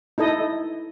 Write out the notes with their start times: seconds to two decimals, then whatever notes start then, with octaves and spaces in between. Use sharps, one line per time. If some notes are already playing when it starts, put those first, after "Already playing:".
0.18 D#4 E4 A4 D#5